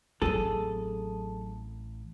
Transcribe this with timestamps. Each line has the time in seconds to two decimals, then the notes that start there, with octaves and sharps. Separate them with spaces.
0.22 A1 F#3 C4 G#4 A4